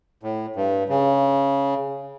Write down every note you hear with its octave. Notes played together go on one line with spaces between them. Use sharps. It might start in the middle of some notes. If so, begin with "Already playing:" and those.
A2
G2
C#3